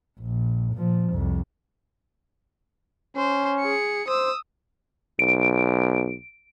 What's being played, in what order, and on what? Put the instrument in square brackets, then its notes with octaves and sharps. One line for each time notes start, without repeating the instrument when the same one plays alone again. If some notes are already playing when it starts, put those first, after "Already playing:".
[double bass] A#1
A#2 F3
C2 F2
[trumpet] C#4 [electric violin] C5
[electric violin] G#4 C#7
[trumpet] C5 [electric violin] D#6 E6
[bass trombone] B1 [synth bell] D7